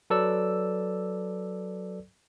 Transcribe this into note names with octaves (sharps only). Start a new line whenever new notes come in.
F#3 A4 B4 D5 E6